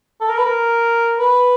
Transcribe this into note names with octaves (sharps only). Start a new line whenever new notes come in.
A4
A#4
B4
A#4
B4